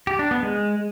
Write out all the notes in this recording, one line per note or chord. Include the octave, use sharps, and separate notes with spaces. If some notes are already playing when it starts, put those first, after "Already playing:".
G4
D4
B3
G#3